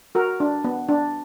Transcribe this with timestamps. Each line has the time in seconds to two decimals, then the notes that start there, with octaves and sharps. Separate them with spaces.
0.15 F#4 A#4
0.40 D4
0.64 B3
0.89 D4